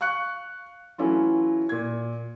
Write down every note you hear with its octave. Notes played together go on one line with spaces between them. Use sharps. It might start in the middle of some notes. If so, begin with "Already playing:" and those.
F5 C#6 F#6 C#7
E3 F#3 A3 C#4 E4 F4
A#2 G#6